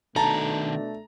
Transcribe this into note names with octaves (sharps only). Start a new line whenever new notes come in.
B2 D#3 A3 D4 A4 A5 A#5